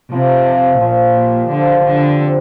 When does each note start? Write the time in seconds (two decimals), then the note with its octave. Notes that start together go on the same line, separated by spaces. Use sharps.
0.12 C3 F3
0.47 F3
0.81 A#2 F3
1.16 G4
1.51 D3 F3
1.87 D3 G4
2.21 C4